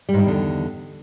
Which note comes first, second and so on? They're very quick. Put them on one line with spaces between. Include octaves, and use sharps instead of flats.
G3 G#2 D#3 E2 D3